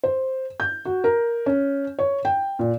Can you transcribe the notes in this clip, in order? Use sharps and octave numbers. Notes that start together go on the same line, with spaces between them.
C5
G6
F#4
A#4
C#4
C#5
G5
A#2